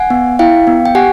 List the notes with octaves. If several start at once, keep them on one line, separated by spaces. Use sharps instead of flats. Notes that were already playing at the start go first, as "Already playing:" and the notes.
Already playing: F#5 G#5
B3
E4 F5 G5
B3
G5
G4 F#5 G#5